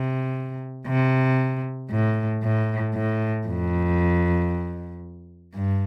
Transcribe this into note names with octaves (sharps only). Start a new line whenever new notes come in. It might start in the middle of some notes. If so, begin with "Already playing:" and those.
Already playing: C3
C3
A2
A2
A2
F2
G2